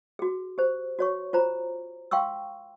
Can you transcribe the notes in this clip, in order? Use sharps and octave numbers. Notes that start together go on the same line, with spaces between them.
F#4 G#4
G4 C5
F#4 C#5 C#6
F4 C5 A#5
F5 G5 C6 C#6 E6